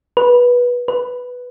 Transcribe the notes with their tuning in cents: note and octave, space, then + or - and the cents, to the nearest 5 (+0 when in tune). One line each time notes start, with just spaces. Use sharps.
B4 -20
B4 +0